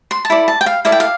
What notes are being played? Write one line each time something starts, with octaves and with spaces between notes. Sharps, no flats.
C6
A5
E4 A4 D5 B5
A5
G5
F5
E4 A4 D5 F5
G5
F5